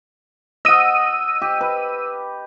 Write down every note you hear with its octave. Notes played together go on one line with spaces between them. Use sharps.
D#5 F#5 E6 D#7
G4
B4